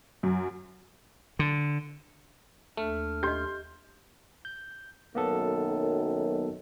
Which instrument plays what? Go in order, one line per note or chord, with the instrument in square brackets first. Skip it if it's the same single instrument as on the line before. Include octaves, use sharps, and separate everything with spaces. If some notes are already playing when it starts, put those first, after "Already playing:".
[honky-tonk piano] F#2
[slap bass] D3
[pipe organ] D#2 D4 F6 [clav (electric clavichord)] A3
[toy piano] G4 D#5 [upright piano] C6 G6
[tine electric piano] G6
[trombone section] B1 F#2 D#3 [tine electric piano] A#3 B3 A4